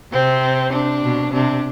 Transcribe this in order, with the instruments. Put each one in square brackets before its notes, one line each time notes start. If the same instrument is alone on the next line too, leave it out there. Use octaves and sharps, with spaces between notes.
[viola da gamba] C3 [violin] C4
[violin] D4
[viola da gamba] B2
[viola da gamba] C3 [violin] D4